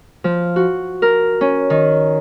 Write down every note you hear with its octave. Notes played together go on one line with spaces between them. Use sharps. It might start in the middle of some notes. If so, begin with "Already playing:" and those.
F3
F#4
A#4
C#4
D#3